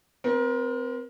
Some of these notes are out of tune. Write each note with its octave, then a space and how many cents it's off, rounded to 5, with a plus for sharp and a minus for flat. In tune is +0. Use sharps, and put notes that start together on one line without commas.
C4 -20 A#4 +30